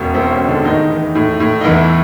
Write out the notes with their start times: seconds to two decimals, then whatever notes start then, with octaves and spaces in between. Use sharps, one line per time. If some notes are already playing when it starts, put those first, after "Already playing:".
Already playing: E1 B2 C#4
0.14 E1 C4
0.32 C#4
0.40 G#3
0.48 D3 D4
0.64 A2 D#3 D#4
0.90 E3
1.15 A2
1.40 A2
1.61 D#4
1.64 E2 E3 E4